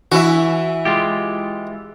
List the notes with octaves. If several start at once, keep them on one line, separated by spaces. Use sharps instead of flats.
E3 E4 F#4 E5
G#3 F4 G4